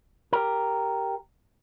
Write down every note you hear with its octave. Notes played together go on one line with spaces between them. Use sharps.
G4 A#4